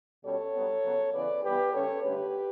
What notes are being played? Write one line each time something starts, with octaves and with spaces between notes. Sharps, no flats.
B2 G3 C#4 A4 C#5
G2 F#3 B3
C#3 F#3 B3
C#3 E3 B3 B4 D5
G2 E3 B3 G4 B4
C#3 G3 C#4 A4 C#5
G2 D3 A3 C#4 G4 B4